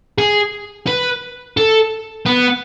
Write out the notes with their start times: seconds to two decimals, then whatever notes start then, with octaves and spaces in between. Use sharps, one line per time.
0.18 G#4
0.87 B4
1.57 A4
2.26 B3